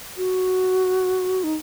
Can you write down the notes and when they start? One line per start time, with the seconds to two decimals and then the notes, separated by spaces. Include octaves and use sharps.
0.17 F#4
1.44 D#4